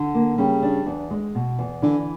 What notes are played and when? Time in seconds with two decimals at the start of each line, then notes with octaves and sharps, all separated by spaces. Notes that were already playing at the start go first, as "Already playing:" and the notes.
Already playing: D3
0.14 A#3
0.38 C#3 G3
0.63 D4
0.86 E2
1.10 G#3
1.35 B2
1.59 E2
1.82 D3 E3